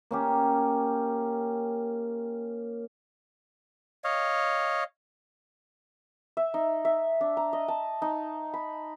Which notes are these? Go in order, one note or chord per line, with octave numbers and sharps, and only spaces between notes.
A#3 C#4 G4
C#5 D#5 F5
E5
D#4
E5
D4
A#5
D#5
A5
D#4
B5